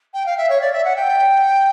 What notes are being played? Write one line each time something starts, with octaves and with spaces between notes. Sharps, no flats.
G5
F5
E5
C#5
D5
E5
F#5
G5